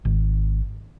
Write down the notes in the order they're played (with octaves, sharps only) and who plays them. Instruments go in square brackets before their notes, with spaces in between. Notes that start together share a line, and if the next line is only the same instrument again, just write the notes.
[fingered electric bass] G#1